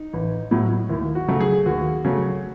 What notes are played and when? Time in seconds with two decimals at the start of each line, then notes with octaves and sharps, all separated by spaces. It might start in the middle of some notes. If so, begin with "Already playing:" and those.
Already playing: D#4
0.13 A1
0.51 A2 F#3
0.90 D#2 E4
1.15 F#4
1.28 C#3 F#3 A3
1.40 G#4
1.66 D#2 F#4
2.05 C#3 F#3 A3